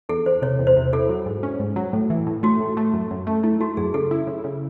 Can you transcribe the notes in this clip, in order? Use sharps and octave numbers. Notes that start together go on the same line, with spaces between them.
E2 A4
E2 C5
C3 C#5
E2
C5
C3
E4 A4
F#3
G#2
C#4
G#2
F#3
A2
E3
A2
A3 F#4
A2
A3
F#2
F#2
A3
A3 E4
A3 F#4
F#2 G#4
C#3 A4
E4
C#3
C#3